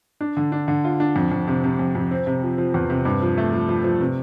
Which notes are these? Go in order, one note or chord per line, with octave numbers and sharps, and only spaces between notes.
D4
D3
D4
D3
F4
D4
F2
F2
C3
C3
F2
F2
C4
C3
F3
F3
E2
C3
G2
F3
A3
F3
F3
F3
C3